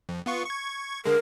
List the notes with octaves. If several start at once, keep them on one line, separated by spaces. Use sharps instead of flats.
F2
B3 F4 C#6
C#6 G#6
D3 G#3 A#4